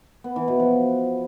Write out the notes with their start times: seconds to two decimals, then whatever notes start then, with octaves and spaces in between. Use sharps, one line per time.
0.24 B3
0.36 E3
0.48 B2
0.59 F3